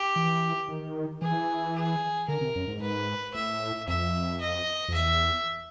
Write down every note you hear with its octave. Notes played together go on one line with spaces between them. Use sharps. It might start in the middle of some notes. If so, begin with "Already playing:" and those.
Already playing: G4
E3
D#3
E3 G#4
G#4
D3 A#4
C3
F#2
G#2
B4
A2 E5
F2 E5
D#5
F2
E2 E5